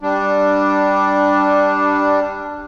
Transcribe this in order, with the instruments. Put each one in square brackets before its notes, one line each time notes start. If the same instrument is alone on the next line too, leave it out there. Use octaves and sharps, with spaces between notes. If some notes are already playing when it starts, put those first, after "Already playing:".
[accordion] G3 D4